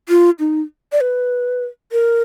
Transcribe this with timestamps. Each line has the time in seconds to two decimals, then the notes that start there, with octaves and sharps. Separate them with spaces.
0.09 F4
0.39 D#4
0.92 D5
1.01 B4
1.92 A#4